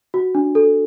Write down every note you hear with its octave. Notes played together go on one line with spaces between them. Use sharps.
F#4
D4
A4